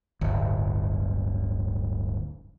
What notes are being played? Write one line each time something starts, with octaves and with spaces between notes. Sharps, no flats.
D1 G1